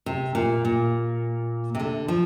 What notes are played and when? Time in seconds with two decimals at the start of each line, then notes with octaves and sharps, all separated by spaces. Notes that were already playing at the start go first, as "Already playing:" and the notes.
0.06 C3
0.35 A#2
0.65 A#2
1.75 C3
1.79 D3
2.08 F3